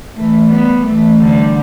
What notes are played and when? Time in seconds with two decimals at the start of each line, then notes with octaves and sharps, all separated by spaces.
0.14 E3 A3
0.50 G3 B3
0.85 E3 A3
1.20 D3 G3